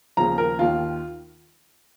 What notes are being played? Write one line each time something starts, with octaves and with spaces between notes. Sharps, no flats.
D#2 C#3 F3 A#5
A#4
D#2 D#3 F4